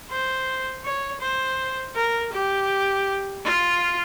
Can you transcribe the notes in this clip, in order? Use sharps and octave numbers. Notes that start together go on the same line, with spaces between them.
C5
C#5
C5
A#4
G4
F4